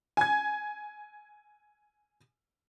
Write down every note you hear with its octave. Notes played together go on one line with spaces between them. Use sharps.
G#5 G#6